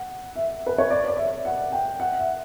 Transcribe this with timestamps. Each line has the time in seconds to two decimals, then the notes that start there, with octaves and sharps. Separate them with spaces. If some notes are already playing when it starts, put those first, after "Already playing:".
Already playing: F#5
0.36 E5
0.67 B4
0.78 C#5
0.90 D5
1.08 D5
1.17 E5
1.45 F#5
1.72 G5
2.00 F#5
2.18 E5